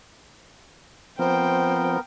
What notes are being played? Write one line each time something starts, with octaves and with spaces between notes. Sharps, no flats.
F3 B3 C4 A#4 C5 G5